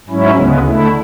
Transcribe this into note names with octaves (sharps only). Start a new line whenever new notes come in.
G#2 F#3 C#4 E4
D2 C#3 G#3 B3
D3 A3 E4